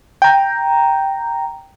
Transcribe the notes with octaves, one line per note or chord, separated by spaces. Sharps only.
G5 A#5